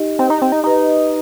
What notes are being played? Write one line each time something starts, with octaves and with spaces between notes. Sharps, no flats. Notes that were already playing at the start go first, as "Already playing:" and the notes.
Already playing: D#4 G4 D#5
C4
D#4
C4
D#4
D#4 G4 B4 D#5